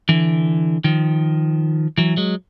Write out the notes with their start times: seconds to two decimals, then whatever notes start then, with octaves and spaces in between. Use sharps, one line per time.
0.09 D3 E3
0.84 D#3 F3
1.98 E3 F#3
2.17 F#3 G#3